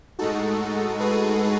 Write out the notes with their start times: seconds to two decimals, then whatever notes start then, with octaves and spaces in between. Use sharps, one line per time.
0.19 A2 G#3 D#4 F#4 A4
1.00 G#4 B4